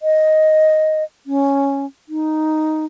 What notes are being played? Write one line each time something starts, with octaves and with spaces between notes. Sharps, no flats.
D#5
C#4
D#4